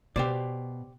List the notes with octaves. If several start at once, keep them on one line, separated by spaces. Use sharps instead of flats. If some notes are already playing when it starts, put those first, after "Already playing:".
B2 G4 C5 D5